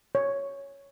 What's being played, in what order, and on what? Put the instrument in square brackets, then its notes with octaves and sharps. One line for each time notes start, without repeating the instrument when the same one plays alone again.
[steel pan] C#5